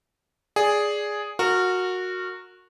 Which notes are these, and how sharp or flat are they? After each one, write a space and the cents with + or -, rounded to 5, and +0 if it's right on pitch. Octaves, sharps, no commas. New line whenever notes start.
G#4 +0 D5 -10
F#4 -15 A#4 -20